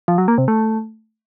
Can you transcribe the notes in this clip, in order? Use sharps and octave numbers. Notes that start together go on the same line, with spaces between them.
F3
F#3
A#3
C3
A3